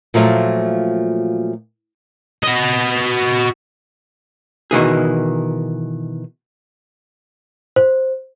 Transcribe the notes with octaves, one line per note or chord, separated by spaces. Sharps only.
A#2 F3 F#3 A3
F#4 D#5
B2 D#3 E3 G#4
C5